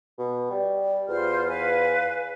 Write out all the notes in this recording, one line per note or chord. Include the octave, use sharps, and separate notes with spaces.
B2
G3
E2 F4 C5 F6
B4 F5 G#5